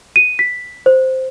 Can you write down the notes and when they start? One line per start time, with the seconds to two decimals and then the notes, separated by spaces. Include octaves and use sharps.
0.16 D#7
0.39 B6
0.86 C5